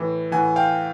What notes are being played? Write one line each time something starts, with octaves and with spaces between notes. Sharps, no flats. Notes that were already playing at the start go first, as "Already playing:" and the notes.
Already playing: A2 E3
A2 E3 F#5 G#5
F5 G5